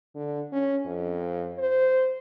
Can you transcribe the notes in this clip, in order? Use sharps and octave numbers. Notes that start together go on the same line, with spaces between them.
D3
C#4
F2
C5